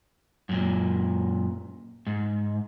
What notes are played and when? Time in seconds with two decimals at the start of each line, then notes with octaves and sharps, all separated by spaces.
0.49 F#2 A#2
2.07 G#2